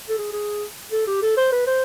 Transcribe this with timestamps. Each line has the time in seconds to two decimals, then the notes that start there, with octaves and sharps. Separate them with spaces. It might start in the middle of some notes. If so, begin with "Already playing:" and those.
0.09 A4
0.18 G#4
0.33 G#4
0.92 A4
1.07 G4
1.22 A4
1.37 C5
1.52 B4
1.67 C5